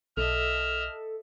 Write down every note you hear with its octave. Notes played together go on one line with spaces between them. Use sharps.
B1 A4 D#5 E5 F6